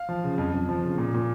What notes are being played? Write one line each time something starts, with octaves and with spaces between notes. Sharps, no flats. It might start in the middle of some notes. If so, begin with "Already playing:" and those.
Already playing: F5
F3
C#3
F2
F2
F3
C#3
A#2
A#2